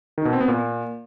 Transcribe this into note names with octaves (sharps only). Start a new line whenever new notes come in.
D#3
B2
C4
B3
A#2